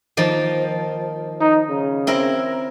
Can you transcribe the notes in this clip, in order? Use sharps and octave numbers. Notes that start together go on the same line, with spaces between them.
D#3 F3 A#3
D#4
C#3
C4 E4 A#4